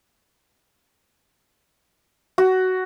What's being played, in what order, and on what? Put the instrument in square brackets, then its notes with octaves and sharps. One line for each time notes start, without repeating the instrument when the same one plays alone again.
[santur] F#4